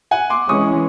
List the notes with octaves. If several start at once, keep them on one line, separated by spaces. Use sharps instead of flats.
F#5 G#5
C6 D6
E3 G#3 C#4 C#6 D#6